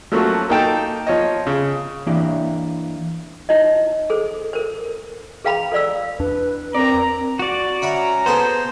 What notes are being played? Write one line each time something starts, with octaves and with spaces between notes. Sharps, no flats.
F3 F#3 A3 A#3 C#4 F#4
A#3 D#4 A4 G5 A5
F3 C#5 D#5
C#3
E3 A#3 D4 E4 G4 D5
D#4 E4 C#5 D#5
G#4 A4 C5
A4 A#4 C5
G#4 B4 F5 G5 A#5 B5
A4 C5 D5 F5 E6
E2 D4 B4
C4 A#4 D5 A#5
F#4 D5
C#4 E5 F#5 A#5 B5
B3 G#4 A4 C5